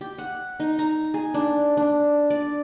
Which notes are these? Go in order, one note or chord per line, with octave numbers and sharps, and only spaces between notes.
G4
F#5
D#4
A#5
G#4
D4
D4
D5